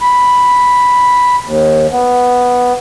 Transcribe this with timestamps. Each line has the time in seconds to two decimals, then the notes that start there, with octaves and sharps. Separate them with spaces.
0.01 B5
1.46 D#2
1.91 B3